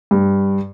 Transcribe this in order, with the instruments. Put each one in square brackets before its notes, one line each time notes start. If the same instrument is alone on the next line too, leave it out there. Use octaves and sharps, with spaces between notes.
[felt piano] G2